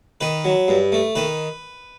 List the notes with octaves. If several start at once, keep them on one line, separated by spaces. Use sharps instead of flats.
D#3 B4
F#3
G2
A3
D#3 B4